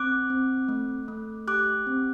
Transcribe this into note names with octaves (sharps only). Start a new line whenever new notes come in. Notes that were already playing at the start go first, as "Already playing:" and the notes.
Already playing: C4 D6 F#6
C4
A3
A3
G4 D6 F#6
C4